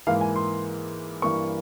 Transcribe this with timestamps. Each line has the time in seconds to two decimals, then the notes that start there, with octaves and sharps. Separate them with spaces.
0.07 G#2 E3 A#3 F5
0.21 G#5
0.36 C6
1.22 G2 E3 A#3 C#6